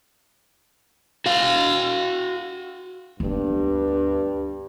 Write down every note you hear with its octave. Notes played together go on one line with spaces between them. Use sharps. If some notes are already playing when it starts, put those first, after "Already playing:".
F#4 F5
D2 G2 B3